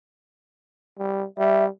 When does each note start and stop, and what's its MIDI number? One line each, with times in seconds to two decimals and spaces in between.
0.98 1.25 55
1.38 1.68 55
1.38 1.64 76